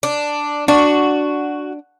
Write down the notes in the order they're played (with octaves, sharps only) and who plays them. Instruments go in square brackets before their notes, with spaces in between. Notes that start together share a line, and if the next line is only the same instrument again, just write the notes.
[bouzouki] D4
[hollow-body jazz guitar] D4 [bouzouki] F#4